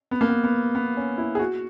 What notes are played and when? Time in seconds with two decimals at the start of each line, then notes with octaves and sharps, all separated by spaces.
0.11 B3
0.21 A#3
0.29 B3
0.44 B3
0.75 B3
0.97 C#4
1.18 E4
1.35 G#4
1.39 F#4